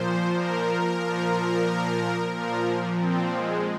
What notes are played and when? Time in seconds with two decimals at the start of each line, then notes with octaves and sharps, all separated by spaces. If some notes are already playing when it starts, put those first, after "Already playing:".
Already playing: A#2 F3 C5
0.35 A#4
1.01 A#2 F3
2.33 A#2 F3 A#4
3.00 C4
3.34 G#3